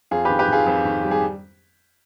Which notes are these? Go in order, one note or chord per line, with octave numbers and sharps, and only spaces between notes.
F2 F4 G#4
G4 B4
D#3
G4 B4
D#3 F4 G#4
F2
D#3
G3
G#4